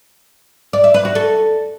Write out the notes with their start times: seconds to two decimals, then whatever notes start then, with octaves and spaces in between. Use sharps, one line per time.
0.73 D5
0.84 E5
0.94 B4
1.05 F#4
1.15 A4